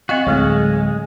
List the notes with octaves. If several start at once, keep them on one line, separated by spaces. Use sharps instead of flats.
C4 F#4 D#5 F5
D2 A2 F#3 G#3 A3 C4